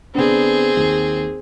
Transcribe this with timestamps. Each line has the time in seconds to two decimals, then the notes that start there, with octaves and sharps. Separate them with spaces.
0.15 D3 B3 C4 D4 G#4
0.77 D#2